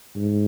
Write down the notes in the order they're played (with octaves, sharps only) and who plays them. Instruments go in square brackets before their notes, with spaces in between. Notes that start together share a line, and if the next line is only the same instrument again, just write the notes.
[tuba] G#2